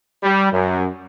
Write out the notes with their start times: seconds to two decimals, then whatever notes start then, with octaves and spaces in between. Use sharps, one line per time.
0.23 G3
0.52 F#2